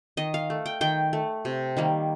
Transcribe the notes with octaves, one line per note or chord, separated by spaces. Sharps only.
D#3 D#5
F5
A3
G5
D#3 G5
A3
C3
D#3 G3 A#3